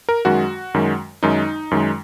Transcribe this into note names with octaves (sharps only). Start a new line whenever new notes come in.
A#4
F#2 D#3 G#3 F#4
F#2 D#3 G#3
F#2 D#3 G#3 D#4
F#2 D#3 G#3